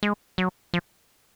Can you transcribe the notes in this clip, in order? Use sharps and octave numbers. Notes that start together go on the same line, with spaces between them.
G#3
F#3
F3